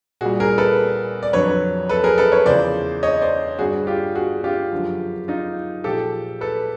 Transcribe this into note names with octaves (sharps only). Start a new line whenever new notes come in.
A#2 G3 F#4 G#4
G#4 A#4
A4 B4
D5
F2 D3 F#3 B4 C#5
A4 B4
G#4 A#4
A4 B4
B4 C#5
E2 C#3 F3 G#3 C5 D5
C#5 D#5
C5 D5
G2 D3 G3 F#4 G#4
F4 G4
F#4 G#4
F4 G4
F#2 D3 F3 G#3
D#4 F4
A#2 F3 G#3 G4 A4
A4 B4